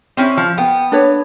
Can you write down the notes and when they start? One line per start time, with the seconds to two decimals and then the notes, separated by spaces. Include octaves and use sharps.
0.17 C4 C#4 E4
0.37 F3
0.58 B3 G5
0.92 D4 B4 C#5